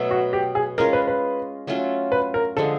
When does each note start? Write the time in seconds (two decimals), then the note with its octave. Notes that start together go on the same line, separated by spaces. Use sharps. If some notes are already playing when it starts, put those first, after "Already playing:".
Already playing: B2 F#3 A3
0.11 F#4
0.33 G4
0.55 G#4
0.78 G#3 C#4 F4 A#4
0.93 B4
1.07 B4
1.67 F#3 A3 C#4 F4
2.12 B4
2.34 A#4
2.57 D3 F3 G#3 A4